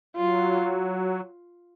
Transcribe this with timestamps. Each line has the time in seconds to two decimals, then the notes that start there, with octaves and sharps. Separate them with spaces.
0.17 F#3 F4